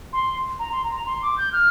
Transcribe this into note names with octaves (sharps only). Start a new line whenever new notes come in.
C6
A#5
C6
A#5
C6
D6
G6
F6